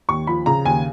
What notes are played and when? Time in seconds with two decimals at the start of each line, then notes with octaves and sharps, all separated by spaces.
0.09 D#2 C#6
0.27 F3 B5
0.46 C#3 A#5
0.65 D#2 G#5